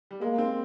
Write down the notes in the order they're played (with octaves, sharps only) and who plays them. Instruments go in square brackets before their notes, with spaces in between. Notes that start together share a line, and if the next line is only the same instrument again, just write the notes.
[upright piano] G3
[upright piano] G#3 [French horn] A#3
[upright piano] C4